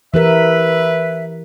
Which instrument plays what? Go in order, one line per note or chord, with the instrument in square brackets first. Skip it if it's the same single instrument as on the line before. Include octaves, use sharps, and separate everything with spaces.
[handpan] E3 G4 A#4 [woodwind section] B4 E5